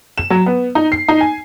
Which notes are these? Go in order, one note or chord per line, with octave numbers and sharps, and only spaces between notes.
E7
F#3
B3
D#4
C7
D#4
G#5